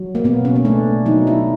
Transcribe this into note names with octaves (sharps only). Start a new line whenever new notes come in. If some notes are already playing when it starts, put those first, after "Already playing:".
Already playing: F#3
A#3
B2 B3
C#4
C#4
A3 D4
F#3 D#4
E4